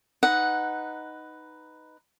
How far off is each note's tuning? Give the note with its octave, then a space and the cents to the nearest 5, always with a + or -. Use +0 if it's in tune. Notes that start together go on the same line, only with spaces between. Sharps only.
D#4 +0 B4 +10 F#5 +0